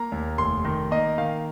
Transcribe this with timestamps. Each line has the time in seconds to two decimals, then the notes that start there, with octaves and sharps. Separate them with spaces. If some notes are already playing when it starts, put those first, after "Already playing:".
Already playing: A#3 A#5
0.12 D#2
0.38 F1 C6
0.65 D#3
0.91 A#3 D#5
1.18 D#3 F5